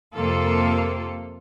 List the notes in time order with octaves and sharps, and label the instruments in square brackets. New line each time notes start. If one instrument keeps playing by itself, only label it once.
[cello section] F2 C3 A#3 F4 A4